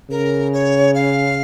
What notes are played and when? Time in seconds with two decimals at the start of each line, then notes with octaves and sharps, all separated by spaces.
0.10 C#3 A#4
0.53 C#5
0.95 F5